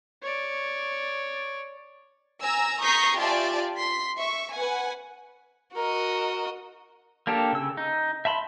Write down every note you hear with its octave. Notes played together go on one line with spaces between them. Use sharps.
C#5 D5
G#5 A#5 E6
A#5 C#6 D#6 G6 B6 C7
F4 G4 D5 E5 G#5 A5
C6 B6
E5 C#6
B4 F#5 G#5
F#4 A#4 D#5
A#3 D4 G4 A4
C#3 E6
D#4
E5 A5 B5 C6